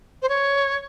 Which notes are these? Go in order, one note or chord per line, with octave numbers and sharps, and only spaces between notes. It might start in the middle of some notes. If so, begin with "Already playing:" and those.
C5
C#5